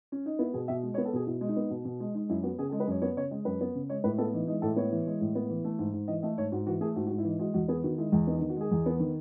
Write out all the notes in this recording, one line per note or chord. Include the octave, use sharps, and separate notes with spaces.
C#4
D#4
B3 E4
B2 G#4
B2 E5
G#3
C#5
B3
A4
B2 G#4
B2 E4
G#3
D#4
B3
B2
B2
G#3
G#3 D#4
F#2 E4
B3 F#4
C#3 G#4
A4
G#3
B4
F#2 C#5
B3 C#5
C#3 C#5
G#3 D#5
F#2 B4
B3
C#3
G#3 C#5
A2 B4
B3 A4
E3 D#4
G#3 D#4
A2 A4
B3 C#5
E3
G#3
A2
B3
E3
A3
G#2
G#2
E3 D#5
A3 D#5
G#2 C#5
G#2 F#4
E3 F#4
A3 G#4
G#2 F#4
F#4
G#2
E4
E3 D#4
G#3 F#4
E2 F#4
B3 G#4
D#3 F#4
G#3 E4
E2
B3 D#4
D#4
D#3
F#4
G#3 G#4
E2
B3
D#3